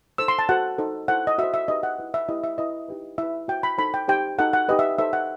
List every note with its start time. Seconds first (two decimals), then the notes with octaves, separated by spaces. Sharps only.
0.18 D#4 A4 C5 E6
0.28 C6
0.39 A5
0.49 F#4 A4 C5 F#5
0.78 D#4 A4 C5
1.08 E4 A4 C5 F#5
1.27 D#5
1.38 F#4 C5 E5
1.54 E5
1.68 D#4 G4 B4 D#5
1.83 F#5
1.99 E4 B4
2.14 E5
2.29 E4 G4 B4 D#5
2.44 E5
2.58 E4 B4 D#5
2.89 D#4 G4 B4
3.18 E4 B4 E5
3.48 F#4 C5 G5
3.63 B5
3.78 D#4 A4 C5 B5
3.94 G5
4.08 D#4 G4 C5 G5
4.38 D#4 F#4 A4 F#5
4.53 F#5
4.69 D#4 G4 B4 D#5
4.79 E5
4.98 D#4 A4 C5 E5
5.13 F#5